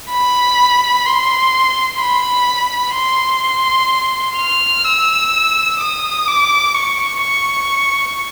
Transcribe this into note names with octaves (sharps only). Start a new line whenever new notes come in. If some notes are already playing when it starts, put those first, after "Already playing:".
B5
C6
B5
C6
F6
E6
D#6
D6
C#6
C#6